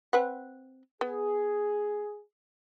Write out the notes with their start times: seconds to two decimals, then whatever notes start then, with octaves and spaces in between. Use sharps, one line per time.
0.13 C4 B4 F#5
1.01 B3 G#4